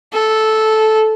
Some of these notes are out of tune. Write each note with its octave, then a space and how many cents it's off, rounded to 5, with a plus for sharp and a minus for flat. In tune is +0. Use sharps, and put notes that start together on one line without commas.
A4 -10